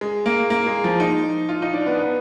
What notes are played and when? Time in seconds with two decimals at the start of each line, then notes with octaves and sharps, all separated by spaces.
0.01 G#3
0.26 A#3
0.50 A#3
0.67 G#3
0.84 F3
1.00 D#4
1.49 F4
1.62 D#4
1.74 D4
1.86 B3
1.99 B3